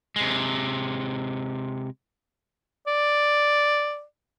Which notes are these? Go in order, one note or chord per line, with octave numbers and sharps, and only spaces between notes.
C3 G#3
D5